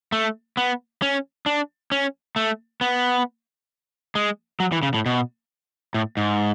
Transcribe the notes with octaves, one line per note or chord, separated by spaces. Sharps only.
A3
B3
C#4
D4
C#4
A3
B3
G#3
F#3
E3
C#3
A2
B2
A2
G#2